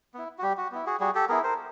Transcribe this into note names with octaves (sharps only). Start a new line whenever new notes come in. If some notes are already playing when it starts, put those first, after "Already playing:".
B3 E4
F#4
G3 G4
F#4
B3 E4
F#4 G#4
G3 F#4 G#4
G4 A4
B3 E4 G#4 A#4
A#4 C5